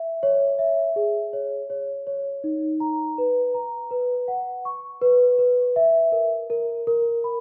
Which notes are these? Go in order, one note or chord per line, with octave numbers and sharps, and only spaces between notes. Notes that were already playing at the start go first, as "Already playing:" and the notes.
Already playing: E5
C#5
E5
G#4
C#5
C#5
C#5
D#4
A#5
B4
A#5
B4
F#5
C#6
B4
B4
E5
A#4
A#4
A#4
B5